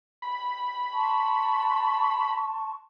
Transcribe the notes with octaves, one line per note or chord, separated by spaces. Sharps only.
B5
A5 C6 C#6